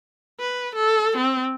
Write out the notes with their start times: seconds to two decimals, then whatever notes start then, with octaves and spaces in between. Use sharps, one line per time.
0.40 B4
0.75 A4
1.17 C4